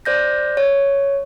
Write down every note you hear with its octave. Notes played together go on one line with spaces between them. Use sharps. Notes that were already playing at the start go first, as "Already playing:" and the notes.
C5 D5 G6 A#6
C#5